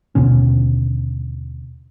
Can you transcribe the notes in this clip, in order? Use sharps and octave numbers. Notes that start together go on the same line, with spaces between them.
D#2 B2 D3 C#4